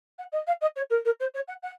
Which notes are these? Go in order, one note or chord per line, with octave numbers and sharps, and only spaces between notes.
F#5
D#5
F5
D#5
C#5
A#4
A#4
C5
C#5
F#5
F#5